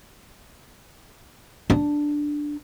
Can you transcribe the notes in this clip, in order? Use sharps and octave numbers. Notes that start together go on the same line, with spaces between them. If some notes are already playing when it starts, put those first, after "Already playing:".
D4